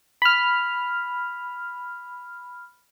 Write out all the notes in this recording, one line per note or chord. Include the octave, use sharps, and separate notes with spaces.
B5 F6